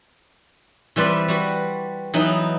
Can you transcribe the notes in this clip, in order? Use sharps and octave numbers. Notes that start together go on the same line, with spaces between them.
E3 G3 C4 B4 D5
G3 F#4 B4
E3 F#3 B3 D#4